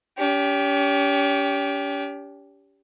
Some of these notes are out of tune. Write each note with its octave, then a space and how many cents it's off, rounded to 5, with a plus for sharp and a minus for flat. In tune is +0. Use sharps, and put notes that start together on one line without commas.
C#4 +40 G4 +0